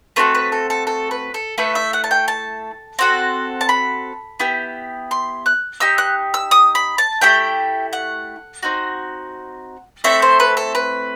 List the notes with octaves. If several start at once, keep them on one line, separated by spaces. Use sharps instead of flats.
A3 C4 F#4 A4 B4
B4
A4
A4
A4
B4
A4
A3 E4 A4 B4
E5
F#5
A5
G5
A5
C4 F#4 A4
A5
B5
B3 E4 G4
C6
F#6
D#4 G4 E6
F#6
E6
D#6
B5
A5
A3 E4 G4 G5
F#5
C4 D#4 F#4
A3 C4 E4 A4 E5
C5
B4
A4
B4